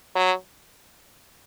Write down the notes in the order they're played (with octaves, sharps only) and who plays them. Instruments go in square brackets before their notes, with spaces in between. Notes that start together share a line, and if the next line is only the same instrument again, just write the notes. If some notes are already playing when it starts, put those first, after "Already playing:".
[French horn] F#3